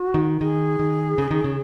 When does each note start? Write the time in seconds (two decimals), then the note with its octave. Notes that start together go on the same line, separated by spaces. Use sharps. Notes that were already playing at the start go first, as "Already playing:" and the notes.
Already playing: F#4
0.14 D#3
0.40 D#3 G#4
0.79 D#3
1.18 C#3
1.31 D#3
1.44 C#3